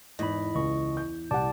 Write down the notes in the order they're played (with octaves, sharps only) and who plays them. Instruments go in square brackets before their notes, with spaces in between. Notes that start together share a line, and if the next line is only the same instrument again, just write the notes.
[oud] E2 [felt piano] G#2 [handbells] D#5 B5
[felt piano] C#2 [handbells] D#5 C#6
[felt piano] G6
[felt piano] C2 G4 F#5 [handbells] D5 A5 D6